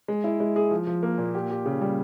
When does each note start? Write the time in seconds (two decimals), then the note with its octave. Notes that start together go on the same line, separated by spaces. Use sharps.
0.08 G#3
0.24 E4
0.40 G#3
0.56 G#4
0.71 F3
0.87 F3
1.03 A#3
1.18 A#2
1.35 G4
1.51 G4
1.66 C#3
1.81 G3